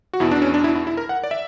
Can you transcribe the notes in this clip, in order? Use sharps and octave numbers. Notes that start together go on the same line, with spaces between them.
F#4
E2 B2 E4
D4
C#4
D4
E4
E4
E4
A#4
F#5
D5
E5